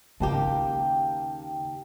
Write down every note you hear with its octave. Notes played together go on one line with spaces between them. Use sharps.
D#2 C#3 A#3 G4 G5 A5